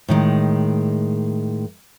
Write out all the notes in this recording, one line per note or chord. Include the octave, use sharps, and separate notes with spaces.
A2 D#3 G#3